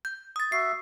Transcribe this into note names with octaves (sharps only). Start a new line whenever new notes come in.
G6
D#6 A6
F#4 E5 C7